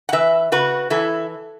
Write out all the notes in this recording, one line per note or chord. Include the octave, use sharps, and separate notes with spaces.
F#5
E3 B4 E5
C#3 F#4 B4
E3 E4 A4